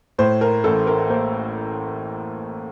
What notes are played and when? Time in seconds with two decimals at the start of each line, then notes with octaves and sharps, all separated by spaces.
0.19 A2 C5
0.41 A#4
0.64 A1 A4
0.87 A#4
1.10 A#3 C5